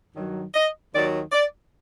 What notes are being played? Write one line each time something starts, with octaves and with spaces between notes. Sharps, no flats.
G2 D#3 F#3
D#5
D#2 D#3 F#3 D5
D5